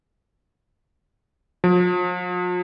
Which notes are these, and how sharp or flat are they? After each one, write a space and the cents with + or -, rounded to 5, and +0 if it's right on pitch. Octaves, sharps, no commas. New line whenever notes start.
F3 +45